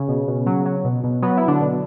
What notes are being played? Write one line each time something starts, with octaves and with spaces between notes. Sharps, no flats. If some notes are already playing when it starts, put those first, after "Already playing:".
Already playing: C#3 C#4
B2
B2
F#3
F#3
B2
B2
F#3 B3
F#3 E4
D3 D4
B2